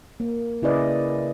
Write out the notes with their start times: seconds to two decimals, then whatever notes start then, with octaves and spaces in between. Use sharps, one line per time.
0.20 A#3
0.62 C#3 E4 G#4 B4 D5 D#5